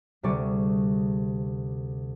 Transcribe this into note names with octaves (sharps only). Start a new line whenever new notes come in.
D2 C3 G3 G#4 D5 C#6